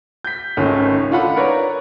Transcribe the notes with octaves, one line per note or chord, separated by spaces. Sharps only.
G6 B6
G#1 C#2 D#3 A3 C#4
D4 D#4 F4 A4 F#5 B5
A#4 B4 C#5 D5 A#5